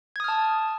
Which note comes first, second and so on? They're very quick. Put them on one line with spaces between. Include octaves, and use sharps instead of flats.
G#6 D#6 F6 A5